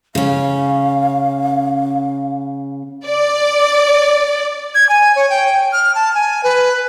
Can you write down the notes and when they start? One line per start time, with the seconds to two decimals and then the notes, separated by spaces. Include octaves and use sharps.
0.15 C#3 C#4 F5
3.06 D5
4.75 G#6
4.89 G#5
5.16 C#5
5.30 G5
5.73 F6
5.95 A5
6.14 G#5
6.43 B4